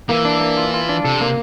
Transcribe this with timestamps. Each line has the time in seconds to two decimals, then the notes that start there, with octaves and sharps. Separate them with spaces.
0.09 E3 A#3
0.25 D4
0.41 A#3
0.57 F4
0.74 F4
0.89 D4
1.04 C3 A4
1.21 A#3